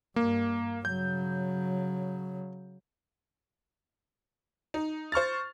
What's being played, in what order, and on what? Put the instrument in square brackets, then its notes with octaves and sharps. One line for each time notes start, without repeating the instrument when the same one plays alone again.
[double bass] G2 [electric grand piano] A#3
[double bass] C#3 F#3 [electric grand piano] G6
[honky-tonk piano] D#4
C5 C#6 F6 A6